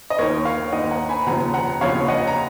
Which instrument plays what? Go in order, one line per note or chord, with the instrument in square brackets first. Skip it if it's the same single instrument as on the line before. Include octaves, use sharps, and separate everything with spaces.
[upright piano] D#5
D#2 D#3 A#4 C#5
C#5 F5
D#2 D#3 D#5 F#5
F#5 A#5
G#5 B5
F1 D#2 C#3 F3 F#5 A#5
F#5 A#5
F1 D#2 C#3 F3 C#5 F5
D#5 F#5
A#5